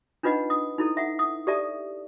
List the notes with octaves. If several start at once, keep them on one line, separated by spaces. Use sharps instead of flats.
D4 D#4 F4 B4 D#5 F#5
D#6
D#4 E4 A4
E5 F#5
D#6
G4 A4 D5 E5 A5